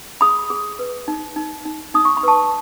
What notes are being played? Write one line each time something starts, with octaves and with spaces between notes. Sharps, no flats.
G#4 B5 D#6
G#4
B4
D#4
D#4
D#4
D#4 D#6
C#6
B5
B4 A5 C#6